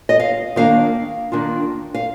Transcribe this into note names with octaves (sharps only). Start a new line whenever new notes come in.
D#5
F5
D#3 A#3 D4 F5
D#3 A#3 D4 F4
F5